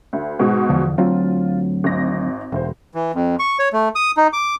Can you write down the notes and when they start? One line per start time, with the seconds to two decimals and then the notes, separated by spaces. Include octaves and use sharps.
0.13 D2
0.39 G#2 B2 G#3
0.69 E2 D3 F3
0.98 D2 F#3 C4 F4
1.84 G#1 A#6
2.52 E1 D2 C5
2.95 E3
3.15 F2
3.39 C#6
3.59 C#5
3.73 A3
3.95 D#6
4.17 D#4
4.33 D6